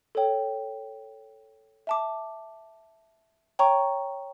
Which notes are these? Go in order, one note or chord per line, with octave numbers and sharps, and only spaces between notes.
A4 C#5 G5
E5 A5 D6
C#5 G5 A#5 C#6